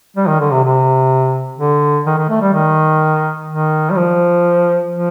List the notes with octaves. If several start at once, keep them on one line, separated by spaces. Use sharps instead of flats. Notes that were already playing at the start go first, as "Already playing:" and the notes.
G3
D#3
D3
C3
C3
D3
D#3
D#3
A3
G3
D#3
D#3
G3
F3
F3